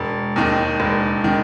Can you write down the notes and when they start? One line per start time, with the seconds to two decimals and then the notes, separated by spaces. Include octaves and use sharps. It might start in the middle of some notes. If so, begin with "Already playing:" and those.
Already playing: E1
0.36 D#2 D#3
0.80 E1
1.24 D#3